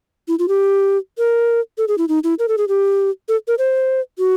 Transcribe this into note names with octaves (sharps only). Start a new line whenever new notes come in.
E4
F4
G4
A#4
A4
G#4
E4
D#4
E4
A#4
A4
G#4
G4
A4
A#4
C5
F#4